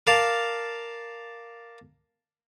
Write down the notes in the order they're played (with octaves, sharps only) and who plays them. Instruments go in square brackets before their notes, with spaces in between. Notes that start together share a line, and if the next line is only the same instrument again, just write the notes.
[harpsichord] A#4 D5 F5 A5